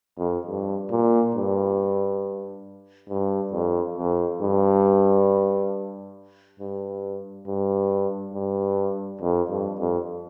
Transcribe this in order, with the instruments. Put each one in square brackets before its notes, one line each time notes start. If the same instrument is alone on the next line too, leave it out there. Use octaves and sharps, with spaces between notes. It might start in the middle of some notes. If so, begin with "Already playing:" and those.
[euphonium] F2
G2
A#2
G2
G2
F2
F2
G2
G2
G2
G2
F2
G2
F2